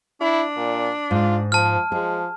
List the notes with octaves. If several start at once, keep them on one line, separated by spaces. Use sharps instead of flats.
D4 E4
A#2
G#2 F4
F3 A5 F6
F3 G#3 G#4